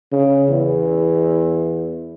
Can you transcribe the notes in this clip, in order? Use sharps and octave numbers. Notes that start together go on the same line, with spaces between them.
C#3
E2